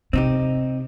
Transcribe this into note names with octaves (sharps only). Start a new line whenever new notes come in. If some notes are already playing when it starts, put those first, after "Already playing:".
C3 C4 D#4 G4